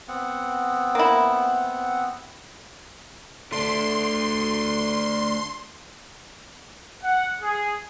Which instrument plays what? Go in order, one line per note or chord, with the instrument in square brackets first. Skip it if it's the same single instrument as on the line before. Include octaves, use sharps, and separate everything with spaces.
[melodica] B3 C4 F#5
[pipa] A#3 E4
[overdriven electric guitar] A3 D4 [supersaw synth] C6
[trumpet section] F#5
G#4